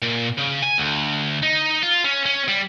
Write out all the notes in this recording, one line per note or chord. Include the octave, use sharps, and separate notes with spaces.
A#2
C#3
G#5
D2
D#4
F4
C#4
C#4
G3